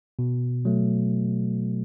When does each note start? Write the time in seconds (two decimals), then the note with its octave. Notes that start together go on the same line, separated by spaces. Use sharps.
0.19 B2
0.65 F#3 A3